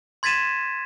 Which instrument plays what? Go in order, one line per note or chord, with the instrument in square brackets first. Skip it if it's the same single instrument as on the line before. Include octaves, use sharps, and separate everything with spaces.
[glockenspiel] C6 G#6 A6 B6 D#7 E7